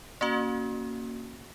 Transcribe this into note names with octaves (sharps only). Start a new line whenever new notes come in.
A#3 C#4 F#4